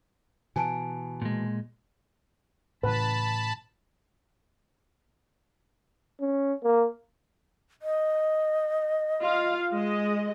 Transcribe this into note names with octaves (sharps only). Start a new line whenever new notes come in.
B2 E3 G#5 A5 D7
A#2 G#3
A2 C#3 E3 B4 A5 B5
C#4
A#3
D#5
F4 F5
G#3 D#5